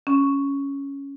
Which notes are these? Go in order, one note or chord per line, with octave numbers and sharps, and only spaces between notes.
C#4